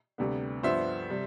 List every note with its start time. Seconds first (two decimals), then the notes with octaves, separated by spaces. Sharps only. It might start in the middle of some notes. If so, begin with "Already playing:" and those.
0.18 D2 C3 G3 B3
0.63 G2 F3 B3 C5 E5
1.10 C3 G3